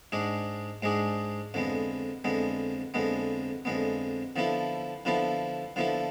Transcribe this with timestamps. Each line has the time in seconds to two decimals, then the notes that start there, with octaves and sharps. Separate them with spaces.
0.12 G#2 G#3 D4 G#4
0.82 G#2 G#3 D4 G#4
1.54 F2 D3 G#3 B3
2.24 F2 D3 G#3 B3
2.94 F2 D3 G#3 B3
3.65 F2 D3 G#3 B3
4.36 D3 F3 B3 E4 A4
5.05 D3 F3 B3 E4 A4
5.76 D3 F3 B3 E4 A4